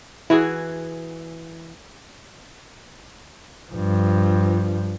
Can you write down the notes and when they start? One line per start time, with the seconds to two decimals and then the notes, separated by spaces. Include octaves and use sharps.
0.30 E3 E4 F#4 G#4
3.71 G2 F3